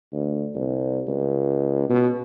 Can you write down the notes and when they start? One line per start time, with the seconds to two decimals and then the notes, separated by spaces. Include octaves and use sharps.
0.13 D2
0.55 C2
1.08 C#2
1.89 B2